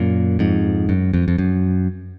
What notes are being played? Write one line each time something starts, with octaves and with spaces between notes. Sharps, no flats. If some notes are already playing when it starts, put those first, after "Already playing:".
Already playing: F#2 A#2
F2 G#2
F#2
F2
F2
F#2